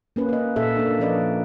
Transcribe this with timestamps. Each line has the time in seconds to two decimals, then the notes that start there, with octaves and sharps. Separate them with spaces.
0.16 A#3 C#4 B4
0.29 B4 D#5
0.56 A#2 A4 E5
0.76 A#3 D4
0.99 F3 C#4 D4 B4 D5 D#5